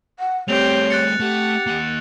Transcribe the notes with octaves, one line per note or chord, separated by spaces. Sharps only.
F#5
G3 A3 C4 G4 C#5 F7
F#6 A6 C#7
A3 G4 F#5
A#3 D#5